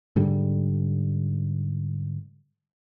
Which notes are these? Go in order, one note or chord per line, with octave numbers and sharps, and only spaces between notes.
G#2 D3 G3